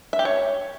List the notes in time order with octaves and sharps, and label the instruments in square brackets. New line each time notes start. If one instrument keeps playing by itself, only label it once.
[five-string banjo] E5
G4
C#5